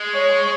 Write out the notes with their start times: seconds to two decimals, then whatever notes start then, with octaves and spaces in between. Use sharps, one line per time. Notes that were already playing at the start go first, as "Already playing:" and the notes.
Already playing: G#3
0.13 C#5